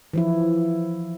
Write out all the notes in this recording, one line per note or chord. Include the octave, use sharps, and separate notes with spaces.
E3 F3 E4